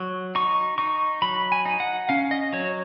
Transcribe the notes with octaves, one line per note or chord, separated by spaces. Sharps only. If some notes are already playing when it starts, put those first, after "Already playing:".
Already playing: F#3 C#6
D#4 C#6
D#4 C#6
F#3 B5
G#5
D#4
F#5
C#4 F5
D#5
F#3 C#5